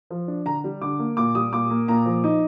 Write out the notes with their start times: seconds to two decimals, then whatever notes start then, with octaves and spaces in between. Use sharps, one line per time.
0.10 F3
0.28 D4
0.46 D3 A#5
0.64 G3
0.82 D3 D6
0.99 A#3
1.17 A#2 D6
1.35 G3 D#6
1.52 A#2 D6
1.70 A#3
1.88 A#2 A#5
2.06 F3
2.24 D#4